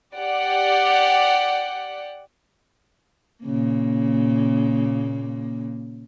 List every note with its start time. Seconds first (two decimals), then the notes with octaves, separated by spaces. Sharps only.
0.17 G4 D5 F#5
3.44 A#2 C#3 A#3